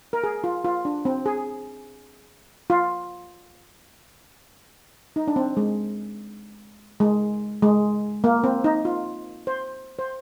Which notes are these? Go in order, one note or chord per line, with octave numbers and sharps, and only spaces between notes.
A#4
G#4
F4
F4
D4
C4
G#4
F4
D#4
D4
C4
G#3
G#3
G#3
A#3
C4
D#4
F4
C5
C5